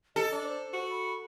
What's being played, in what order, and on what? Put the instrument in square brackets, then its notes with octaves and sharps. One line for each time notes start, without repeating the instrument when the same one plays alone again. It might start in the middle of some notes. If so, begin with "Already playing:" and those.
[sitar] A4 [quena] D#5
[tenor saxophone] D4
[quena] C5
[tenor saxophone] F#4
[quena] B5